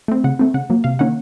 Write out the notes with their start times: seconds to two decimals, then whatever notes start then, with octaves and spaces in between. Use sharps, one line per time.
0.08 A3 C4
0.24 C#3 F#5
0.39 A3 C4
0.54 C#3 F#5
0.70 F#3 A#3
0.84 C3 F5
0.99 D#3 A#3 C#4 F#5